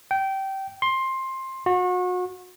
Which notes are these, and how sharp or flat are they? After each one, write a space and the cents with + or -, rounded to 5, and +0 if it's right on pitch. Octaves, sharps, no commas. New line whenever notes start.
G5 -20
C6 +15
F#4 -35